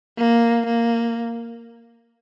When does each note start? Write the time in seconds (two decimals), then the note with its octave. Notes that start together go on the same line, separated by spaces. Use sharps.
0.18 A#3
0.66 A#3